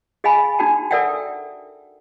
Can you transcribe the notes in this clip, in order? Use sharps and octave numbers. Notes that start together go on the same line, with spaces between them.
G#4 D#5 F5 G5 G#5 B5
D4 D#4 F#4 G5 A5
A4 A#4 D5 E5 F#5 G5